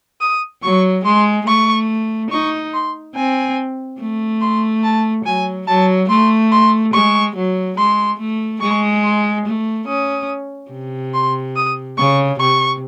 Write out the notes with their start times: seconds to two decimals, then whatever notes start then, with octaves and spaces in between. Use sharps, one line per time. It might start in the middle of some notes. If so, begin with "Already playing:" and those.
0.21 D#6
0.63 F#3 C#6
1.05 G#3 C6
1.47 A3 C#6
2.31 D#4 C#6
2.73 C6
3.15 C4 G#5
4.00 A3
4.41 C6
4.83 A5
5.25 F#3 G#5
5.67 F#3 A5
6.09 A3 C6
6.52 C6
6.93 G#3 C#6
7.36 F#3
7.77 G#3 C6
8.19 A3
8.61 G#3 C#6
9.04 C6
9.46 A3
9.88 C#4 D#6
10.71 C3
11.14 C6
11.56 D#6
11.97 C#3 C#6
12.39 C3 C#6